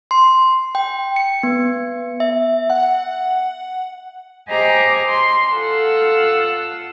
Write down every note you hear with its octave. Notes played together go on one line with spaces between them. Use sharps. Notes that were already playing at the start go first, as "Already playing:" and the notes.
C6
G5
C#7
B3
E5
F#5
G4 C5 D#5 G#5 A#5 D6
C6
F4 A4 F#5 E6